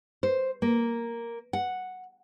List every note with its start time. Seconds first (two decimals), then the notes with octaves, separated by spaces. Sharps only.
0.23 C5
0.62 A#3
1.53 F#5